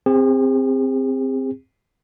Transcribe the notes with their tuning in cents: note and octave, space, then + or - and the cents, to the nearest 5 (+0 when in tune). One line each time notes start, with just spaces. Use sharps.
C4 +0 G#4 -45